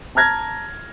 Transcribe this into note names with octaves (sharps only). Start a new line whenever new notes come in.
A5 A#5 F6 G#6 A#6